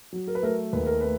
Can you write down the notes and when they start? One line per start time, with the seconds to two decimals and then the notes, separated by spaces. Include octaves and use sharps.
0.13 F#3
0.28 A#4
0.35 B4
0.43 A3 A#4
0.73 D#2 B4
0.86 A#4
1.01 A3 B4